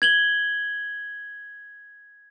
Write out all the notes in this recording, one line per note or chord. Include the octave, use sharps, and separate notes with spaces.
G#6 F#7 G7